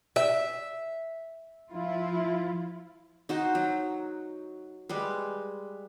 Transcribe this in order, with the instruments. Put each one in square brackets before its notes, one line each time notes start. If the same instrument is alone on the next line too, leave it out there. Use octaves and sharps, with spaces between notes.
[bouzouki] E5
[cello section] F3 E4 F4
[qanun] D#4 F#4 C5
F#3
G3 G#3 B4